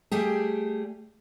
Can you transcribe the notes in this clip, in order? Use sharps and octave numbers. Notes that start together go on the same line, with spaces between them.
G3 A3 G4 G#4